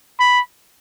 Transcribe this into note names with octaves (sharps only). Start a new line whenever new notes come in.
B5